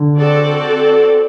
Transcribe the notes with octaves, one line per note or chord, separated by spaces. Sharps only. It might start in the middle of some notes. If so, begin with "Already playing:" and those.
Already playing: D3
C4 F#4 A4 D5